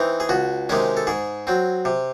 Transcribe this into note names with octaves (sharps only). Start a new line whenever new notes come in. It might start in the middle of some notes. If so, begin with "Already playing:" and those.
Already playing: E3 C4 D#4
G#4
C#2 F#4
C3 D#3 G#3 C#4
A4
G#2 G#4
F#3 C4
C3